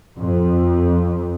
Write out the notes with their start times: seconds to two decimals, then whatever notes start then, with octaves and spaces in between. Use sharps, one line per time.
0.19 F2